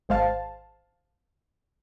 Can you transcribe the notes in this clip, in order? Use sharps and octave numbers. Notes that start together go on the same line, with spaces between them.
G#1 G#3 C5 F5 A5